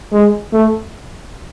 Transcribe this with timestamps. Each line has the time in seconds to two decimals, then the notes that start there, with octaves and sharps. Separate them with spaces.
0.12 G#3
0.53 A3